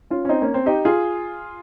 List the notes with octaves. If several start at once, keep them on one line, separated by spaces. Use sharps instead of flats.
C#4 F4
C#4
C4 D#4
A#3 C#4
C4
D#4 G4
F4 G#4